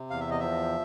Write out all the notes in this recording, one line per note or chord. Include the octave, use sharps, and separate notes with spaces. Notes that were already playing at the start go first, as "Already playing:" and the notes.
Already playing: C3
E2 F5
E5
D#5
F3 E5